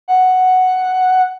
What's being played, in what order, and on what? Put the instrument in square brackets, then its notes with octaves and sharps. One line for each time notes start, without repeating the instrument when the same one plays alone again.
[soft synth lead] F#5